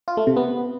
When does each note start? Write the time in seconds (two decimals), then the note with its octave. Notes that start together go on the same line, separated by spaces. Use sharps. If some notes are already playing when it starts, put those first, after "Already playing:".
0.08 F4
0.17 A3
0.27 C3
0.37 B3